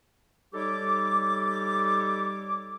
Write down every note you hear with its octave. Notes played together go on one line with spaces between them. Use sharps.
G3 D#4 G4 A4 C#5 D6